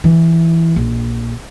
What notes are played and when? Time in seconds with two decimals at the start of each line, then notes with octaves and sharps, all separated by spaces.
0.04 E3
0.76 A#1